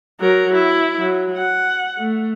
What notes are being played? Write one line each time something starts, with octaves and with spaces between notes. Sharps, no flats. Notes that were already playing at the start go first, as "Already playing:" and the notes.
F#3 A#4
E4
F#3
F#5
A3